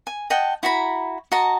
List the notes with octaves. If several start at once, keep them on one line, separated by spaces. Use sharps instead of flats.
G#5
D#5 F#5 G5 A5
E4 F#4 A#5 B5
F#4 D#5 A5 A#5